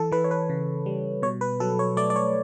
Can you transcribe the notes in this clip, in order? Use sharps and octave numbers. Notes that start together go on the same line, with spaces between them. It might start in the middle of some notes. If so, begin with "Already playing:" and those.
Already playing: E3 A4
E3 B4
C#5
B4
C#3
G3
B2 C#5
B4
F#3 A4
C#5
A3 D5
D5
C#5